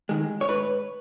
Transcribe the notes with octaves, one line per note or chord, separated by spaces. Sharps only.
D#3 G#3
C#5
G#2 B4